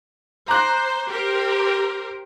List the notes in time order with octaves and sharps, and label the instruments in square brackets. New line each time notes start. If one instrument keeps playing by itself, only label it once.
[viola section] C5 [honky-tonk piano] A#5 D6 F#6
[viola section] G4 A#4 C5